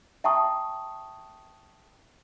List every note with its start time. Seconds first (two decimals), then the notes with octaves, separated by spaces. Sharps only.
0.24 E5 G5 A5 A#5 C#6 D#6